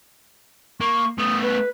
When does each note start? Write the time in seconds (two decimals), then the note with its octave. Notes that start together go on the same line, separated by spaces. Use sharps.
0.80 A#3 C#6
1.18 A3 B3 D#6
1.42 B4